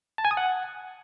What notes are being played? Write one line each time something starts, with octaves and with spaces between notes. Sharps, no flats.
A5
G#5
D#6
F#5